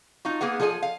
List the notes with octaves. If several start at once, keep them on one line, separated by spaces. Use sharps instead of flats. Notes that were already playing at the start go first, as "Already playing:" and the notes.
D#4 F4 F#4
A#3 B3 G#4 F#5
F3 G#4 A4 C5 G#5
F5